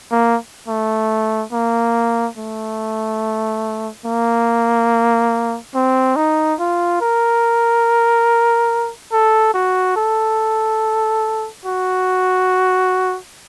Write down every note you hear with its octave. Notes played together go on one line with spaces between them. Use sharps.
A#3
A3
A#3
A3
A#3
C4
D#4
F4
A#4
A4
F#4
A4
F#4